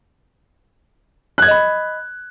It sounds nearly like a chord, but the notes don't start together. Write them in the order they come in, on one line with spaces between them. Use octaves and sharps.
F#6 G#6 D#5 B5